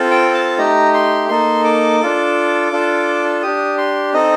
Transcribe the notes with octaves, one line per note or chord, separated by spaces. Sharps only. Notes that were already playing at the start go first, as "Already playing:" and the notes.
Already playing: C4 F4 A4
G5
A5
A3 D#4 G4 A#5
C6
A#3 D#4 A4 C6
D6
D4 F4 A4
D4 F4 A4
D4 G4 D#6
C6
C4 D#4 A4 D#5